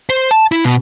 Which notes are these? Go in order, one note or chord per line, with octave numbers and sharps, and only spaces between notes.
C5
A5
E4
B2